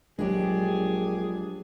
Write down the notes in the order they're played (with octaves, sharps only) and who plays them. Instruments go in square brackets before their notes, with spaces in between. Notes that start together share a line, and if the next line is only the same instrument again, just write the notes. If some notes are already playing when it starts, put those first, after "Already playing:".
[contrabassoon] A#1 [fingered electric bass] F#3 G#3 [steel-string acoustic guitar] D4 G4 [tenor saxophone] G#4